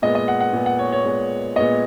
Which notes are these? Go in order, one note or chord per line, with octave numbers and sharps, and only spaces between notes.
A#2 G#3 B3 D#5
D#5
F#5
F#5
A#2 G#3 B3
F#5
C#5
C#5
A#2 G#3 B3
A#2 G#3 B3 D#5